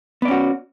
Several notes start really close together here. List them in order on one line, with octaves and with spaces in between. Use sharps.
B3 D5 C#4 F#4